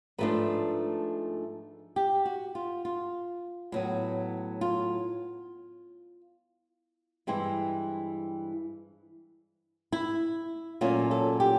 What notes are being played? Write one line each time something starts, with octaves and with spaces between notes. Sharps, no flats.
G#2 F3 A3 D4 B4
G4
F#4
F4
F4
A2 F#3 B3
F4
G2 E3 G#3 C4 E4
E4
A#2 F#3 A3 C#4 F4
A4
G4